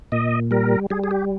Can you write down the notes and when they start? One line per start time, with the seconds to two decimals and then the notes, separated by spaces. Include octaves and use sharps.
0.12 A#2 D#5
0.51 G3 A#4
0.90 G3 G#4
1.04 G#4
1.11 G4